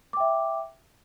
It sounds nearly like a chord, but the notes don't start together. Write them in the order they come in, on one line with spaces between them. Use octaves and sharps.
D6 G5 E5